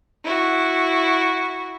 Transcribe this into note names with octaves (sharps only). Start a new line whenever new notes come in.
E4 F#4